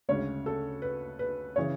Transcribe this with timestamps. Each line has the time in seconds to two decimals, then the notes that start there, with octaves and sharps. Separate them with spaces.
0.09 D2 C#3 G#3 C#4 C#5
0.46 A4
0.82 B4
1.19 B4
1.56 C#3 E3 C#5